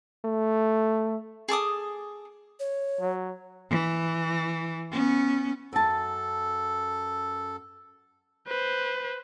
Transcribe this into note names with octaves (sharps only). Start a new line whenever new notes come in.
A3
G#4 A4 D6 D#6
C#5
F#3
E3
B3 C#4
F#2 A4 A5
B4 C5